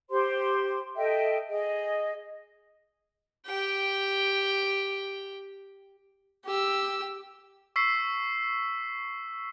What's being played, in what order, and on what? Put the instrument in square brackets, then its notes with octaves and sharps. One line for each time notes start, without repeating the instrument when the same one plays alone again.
[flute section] G4 C5 C6
A4 D#5 E5 G5
G#4 D#5
[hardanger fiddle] G4 G5
[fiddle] G4 E6
[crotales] C#6 E6 B6 C7